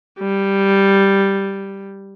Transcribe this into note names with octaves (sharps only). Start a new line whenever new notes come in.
G3